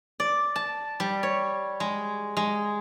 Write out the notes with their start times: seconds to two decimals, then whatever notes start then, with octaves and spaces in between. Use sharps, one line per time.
0.20 D5
0.56 A5
1.00 G3
1.23 C#5
1.80 G#3
2.37 G#3